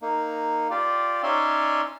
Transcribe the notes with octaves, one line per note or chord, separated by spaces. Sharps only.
A#3 D#4
F4 G4 D5
C#4 D#4 C#5 D5 E5 C6